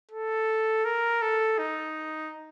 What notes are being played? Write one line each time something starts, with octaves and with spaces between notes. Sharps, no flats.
A4
A#4
A4
D#4